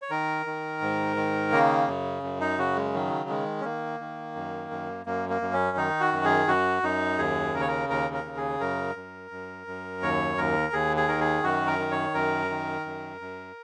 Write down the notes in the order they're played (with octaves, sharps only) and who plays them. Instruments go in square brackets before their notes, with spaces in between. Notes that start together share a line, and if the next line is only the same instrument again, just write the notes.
[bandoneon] C#5
D#3 A#4
D#3
G#2
D#3
C#3 A#3
F#2
F#2
D#4
C#3 F#4
G#3
D#3 F#3
D#3 G#3
C#4
D#3 A#3
D#3
F#2
F#2
F#2 A#3
A#3
F#2
C#4
D#3 D#4
F#4
F#2
G#4
F#2 F#4
F#2 D#4
D#2 G#4
C#3 A#4
C#5
A#4
D#2 A#4
A#4
C#3
G#4
F#2 A#4
F#2
F#2
F#2
D#2 C#5
D#2 A#4
D#2 G#4
G#4
D#3 A#4
G#4
F#2 F#4
A#4
D#3
C#5
F#2 A#4
D#3
F#2
F#2